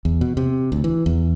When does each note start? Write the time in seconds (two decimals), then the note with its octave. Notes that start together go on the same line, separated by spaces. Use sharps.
0.05 E2
0.21 B2
0.37 C3
0.72 D2
0.84 E3
1.06 E2